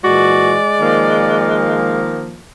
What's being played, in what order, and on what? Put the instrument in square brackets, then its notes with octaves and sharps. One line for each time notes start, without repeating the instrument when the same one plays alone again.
[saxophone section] A#2 E3 F#4 [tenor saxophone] G#3 [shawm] D5
[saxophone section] D#3 F3 A#3